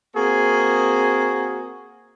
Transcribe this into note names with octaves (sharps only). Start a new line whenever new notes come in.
A#3 C4 F#4 G#4